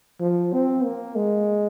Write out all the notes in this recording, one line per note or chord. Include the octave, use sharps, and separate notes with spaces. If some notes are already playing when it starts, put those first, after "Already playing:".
F3
C4
A#3
G#3